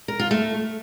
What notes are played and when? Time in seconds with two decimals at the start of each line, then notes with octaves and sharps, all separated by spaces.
0.08 A#4
0.20 F4
0.31 A3